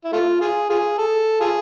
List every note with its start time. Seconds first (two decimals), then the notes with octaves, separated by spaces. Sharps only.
0.04 E4
0.13 A3 F4
0.41 F4 G#4
0.70 F4 G#4
0.98 A4
1.41 F4 G#4